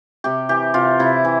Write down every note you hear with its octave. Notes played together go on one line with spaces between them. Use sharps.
C3 G4
E3 G4
C3 F4
C3 E4
E3